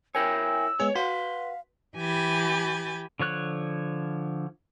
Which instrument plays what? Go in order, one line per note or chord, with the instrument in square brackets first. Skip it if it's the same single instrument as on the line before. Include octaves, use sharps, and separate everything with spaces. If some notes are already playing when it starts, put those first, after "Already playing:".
[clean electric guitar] E4 A#4 C#5 [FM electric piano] G5 G#5 [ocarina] E6
[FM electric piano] G#3 B3 G#4 [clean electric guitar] C#5
[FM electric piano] F#4 [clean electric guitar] B4 C6 [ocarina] F5
[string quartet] E3 G4 G#5 B5 G6 A6
[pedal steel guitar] D3 F3 C#5 F#6